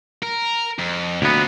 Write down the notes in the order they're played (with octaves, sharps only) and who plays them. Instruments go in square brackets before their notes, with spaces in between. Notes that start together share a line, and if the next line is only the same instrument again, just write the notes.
[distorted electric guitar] A#4
F2
[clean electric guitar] D2 B3 [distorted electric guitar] A#2 C4